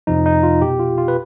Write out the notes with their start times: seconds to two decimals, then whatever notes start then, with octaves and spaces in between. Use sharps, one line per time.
0.07 F2 C3 F3 D#4
0.26 D#4
0.43 F4
0.62 B2 G4
0.79 F4
0.98 F4
1.08 B4